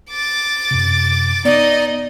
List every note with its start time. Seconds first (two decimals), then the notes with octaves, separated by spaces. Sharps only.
0.11 D6 A6
0.71 F#2 C3
1.45 B3 D#4 D5 D#5